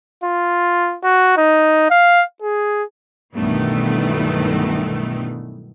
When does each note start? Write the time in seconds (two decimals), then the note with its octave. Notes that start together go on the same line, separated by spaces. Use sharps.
0.24 F4
1.03 F#4
1.37 D#4
1.91 F5
2.42 G#4
3.35 B1 G2 D#3 E3 A3 B3